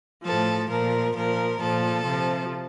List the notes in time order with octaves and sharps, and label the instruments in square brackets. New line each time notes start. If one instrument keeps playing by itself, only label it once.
[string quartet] A2 F3 A4
A#2 F3 A#4
A#2 F3 A#4
A#2 F3 A4
C3 F3